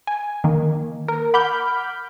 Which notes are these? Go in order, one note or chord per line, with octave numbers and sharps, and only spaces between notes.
G#5
D#3 A#3
A#4
F#5 B5 D6 F6 G6